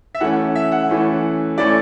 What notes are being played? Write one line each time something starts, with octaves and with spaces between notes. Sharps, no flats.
E5
E3 A3 C#4 F#5
E5
F#5
E3 A3 C#4
E3 A3 C#4 D5